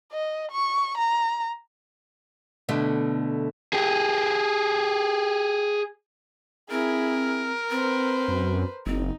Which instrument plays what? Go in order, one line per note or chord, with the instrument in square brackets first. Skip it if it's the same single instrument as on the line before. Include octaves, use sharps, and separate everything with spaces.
[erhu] D#5
C#6
A#5
[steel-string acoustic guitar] B2 D3 A3
[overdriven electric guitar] G4 G#4
[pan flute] C4 [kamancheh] E4 G#4 [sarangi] A#4
[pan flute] C4 [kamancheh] B4 C5
[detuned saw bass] F#2
[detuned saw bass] F#1 [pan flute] C4 [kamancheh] D#4